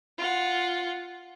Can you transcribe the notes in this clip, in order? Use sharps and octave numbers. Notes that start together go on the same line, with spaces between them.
F4 F#5